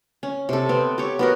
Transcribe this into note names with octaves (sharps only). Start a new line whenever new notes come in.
C#4
C3 A4
B3 C4
G4 C#5
B3 F#4 A#4